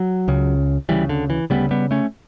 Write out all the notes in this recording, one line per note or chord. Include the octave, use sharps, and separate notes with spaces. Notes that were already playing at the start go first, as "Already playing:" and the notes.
Already playing: F#3
C#2 C#3
D2 C#3 E3 G3
D3
E3
D2 C#3 G3 B3
G3 B3
A3 C#4